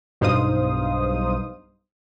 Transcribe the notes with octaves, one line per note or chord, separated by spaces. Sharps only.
B1 G2 D#4 C5 F5 D#6